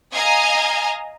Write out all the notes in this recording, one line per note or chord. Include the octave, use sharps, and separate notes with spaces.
D#5 F5 G#5 A#5